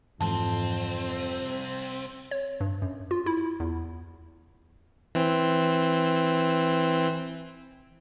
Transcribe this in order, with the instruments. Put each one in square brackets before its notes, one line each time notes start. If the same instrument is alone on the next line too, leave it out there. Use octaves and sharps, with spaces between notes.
[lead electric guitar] C2 C4 [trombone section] F2 [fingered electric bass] G#2 E3 [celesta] A5
[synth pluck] C#5
G2
F#2
F4
E4
E2
[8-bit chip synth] E3 C4